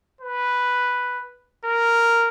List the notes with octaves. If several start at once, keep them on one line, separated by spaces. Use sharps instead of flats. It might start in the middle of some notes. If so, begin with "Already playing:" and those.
B4
A#4